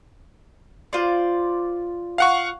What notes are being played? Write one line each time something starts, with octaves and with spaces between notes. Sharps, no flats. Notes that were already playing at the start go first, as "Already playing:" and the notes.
F4 C5 D5
F5 F#5 C#6